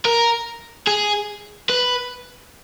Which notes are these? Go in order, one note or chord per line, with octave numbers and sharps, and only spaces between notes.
A#4
G#4
B4